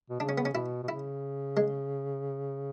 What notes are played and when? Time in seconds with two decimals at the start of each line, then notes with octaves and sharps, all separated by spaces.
0.10 B2
0.20 C#3 D4
0.29 C#4
0.38 B3
0.45 C#4
0.54 B2 E4
0.83 B2
0.88 C#3 E4
1.57 G#3